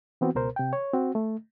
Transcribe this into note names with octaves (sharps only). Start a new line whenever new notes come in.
E3 B3 C4 F#4
C#2 B2 A#4 C5
C3 G5
C#5
C4 F#4
A3